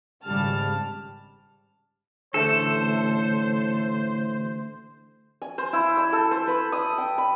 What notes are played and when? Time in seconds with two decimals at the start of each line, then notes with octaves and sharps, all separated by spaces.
0.24 G#1 C#3 G3 A5 F6
2.34 A1 D3 A3 A4 C5
5.42 G#5
5.58 C5
5.73 E4
5.97 E6
6.13 A4
6.31 C5
6.47 B4
6.72 D#6
6.98 G5
7.18 B5